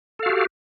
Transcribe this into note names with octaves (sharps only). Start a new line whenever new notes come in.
F#4 G4 A4 F5